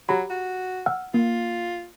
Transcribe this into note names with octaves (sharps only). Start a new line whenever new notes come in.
F#3 G4 A#5 B5
F#4
F#5 E6 F6
A#3 F4